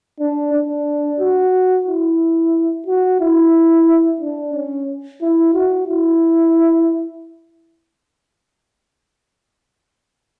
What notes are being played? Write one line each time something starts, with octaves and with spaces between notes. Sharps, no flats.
D4
D4
F#4
E4
F#4
E4
D4
C#4
E4
F#4
E4